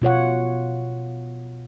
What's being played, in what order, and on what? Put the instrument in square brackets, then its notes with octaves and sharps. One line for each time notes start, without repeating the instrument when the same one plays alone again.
[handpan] B2 F4 C#5 F#5